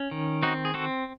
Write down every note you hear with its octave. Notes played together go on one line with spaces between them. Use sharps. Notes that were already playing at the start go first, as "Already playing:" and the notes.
Already playing: C#4
D#3
C4 D#4 F#4
G#4
C4 F#4 A4